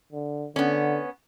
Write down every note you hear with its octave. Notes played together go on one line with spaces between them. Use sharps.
D3
D3 B3 C#4